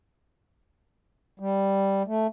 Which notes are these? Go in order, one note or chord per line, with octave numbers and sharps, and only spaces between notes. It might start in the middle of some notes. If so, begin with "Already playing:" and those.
G3
A3